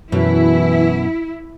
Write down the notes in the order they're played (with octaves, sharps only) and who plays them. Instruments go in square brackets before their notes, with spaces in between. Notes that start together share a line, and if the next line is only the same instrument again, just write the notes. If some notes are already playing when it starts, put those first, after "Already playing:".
[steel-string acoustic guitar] F#2 B2 [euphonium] E3 [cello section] E4